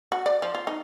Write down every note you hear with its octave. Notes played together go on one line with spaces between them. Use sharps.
F#4
D5
F3
F4
D#4